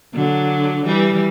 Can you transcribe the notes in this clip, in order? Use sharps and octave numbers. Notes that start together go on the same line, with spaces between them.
D3 F#3
E3 G3